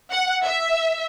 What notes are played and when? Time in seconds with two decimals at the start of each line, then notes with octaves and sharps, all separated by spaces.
0.11 F#5
0.44 E5